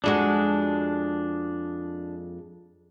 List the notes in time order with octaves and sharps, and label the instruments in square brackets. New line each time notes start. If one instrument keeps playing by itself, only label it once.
[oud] F2 G#3 F#4 [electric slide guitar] D4